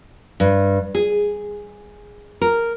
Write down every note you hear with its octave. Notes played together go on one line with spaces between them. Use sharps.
G2
G#4
A#4